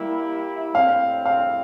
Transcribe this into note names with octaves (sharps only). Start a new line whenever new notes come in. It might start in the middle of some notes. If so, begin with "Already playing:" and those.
Already playing: G3 A#3 E4 G4
A2 G3 C4 F5
F5